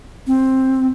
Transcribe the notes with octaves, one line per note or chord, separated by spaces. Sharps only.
C4